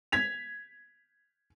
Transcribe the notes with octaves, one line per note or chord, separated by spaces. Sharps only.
G#6 B6 F7